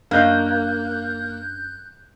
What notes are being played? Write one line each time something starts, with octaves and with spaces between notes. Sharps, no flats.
F#2 A#3 D4 D#5 F5 F#6 G6